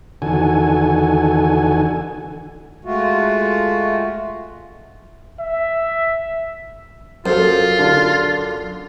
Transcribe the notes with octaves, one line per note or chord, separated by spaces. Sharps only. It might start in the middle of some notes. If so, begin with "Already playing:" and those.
E2 D3 D#3 F#4 A4 G#5
G#3 A3 F4 F#4
E5
F#2 F4 A4 C5
D3 D4 A4